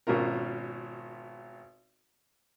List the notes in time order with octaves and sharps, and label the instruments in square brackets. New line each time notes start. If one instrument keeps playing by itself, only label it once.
[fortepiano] G#1 B2 C#4 F4 A#4